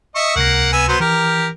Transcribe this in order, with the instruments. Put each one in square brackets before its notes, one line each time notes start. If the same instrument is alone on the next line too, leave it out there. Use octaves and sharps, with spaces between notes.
[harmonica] D#5 E5 C#6
[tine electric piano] C#2 C3 A#6 [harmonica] A#3 F#5
[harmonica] B3 G#5 E6
F#3 B3 C5
[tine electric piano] E3 [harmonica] G4 A#4